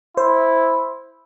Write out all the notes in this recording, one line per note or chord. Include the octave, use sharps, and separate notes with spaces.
E4 C5